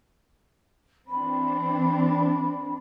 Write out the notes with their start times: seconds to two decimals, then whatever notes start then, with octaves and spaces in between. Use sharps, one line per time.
1.07 E3 C4 D4 B5